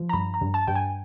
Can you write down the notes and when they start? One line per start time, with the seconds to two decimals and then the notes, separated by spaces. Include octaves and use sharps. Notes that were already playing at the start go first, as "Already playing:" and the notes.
Already playing: F3
0.09 A#5
0.13 G2 B5
0.34 A#5
0.41 G2
0.54 A5
0.68 G2 G5
0.75 G#5